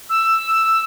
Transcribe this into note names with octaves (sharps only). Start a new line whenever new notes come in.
E6